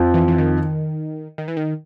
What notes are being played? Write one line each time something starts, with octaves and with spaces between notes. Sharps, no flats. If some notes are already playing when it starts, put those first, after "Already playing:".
Already playing: F2 F3
E3
E3
D#3
D#3
E3
D#3